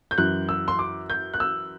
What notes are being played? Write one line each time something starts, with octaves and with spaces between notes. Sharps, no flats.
G6
F#2 E3 F#6
E6
C6
D6
G6
F#6
E6